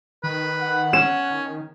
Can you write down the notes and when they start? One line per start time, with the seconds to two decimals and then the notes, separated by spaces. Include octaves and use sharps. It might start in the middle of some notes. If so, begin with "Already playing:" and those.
0.24 D#3 B4
0.59 F#5
0.93 C#4 E7
1.31 D#3